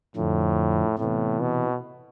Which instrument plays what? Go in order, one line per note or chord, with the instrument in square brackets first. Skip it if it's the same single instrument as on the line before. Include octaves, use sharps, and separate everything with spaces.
[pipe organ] F2 D3 F3 [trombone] A2
[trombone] A2 [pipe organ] C3 E3 B3
[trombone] B2